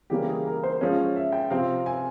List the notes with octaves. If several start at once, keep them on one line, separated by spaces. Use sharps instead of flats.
C#3 E3 G3 A#3 C#4 G4
G#4
A#4
C5
F3 G#3 C#4 C#5
C#5
E5
G5
C3 F3 C4 F5
G#5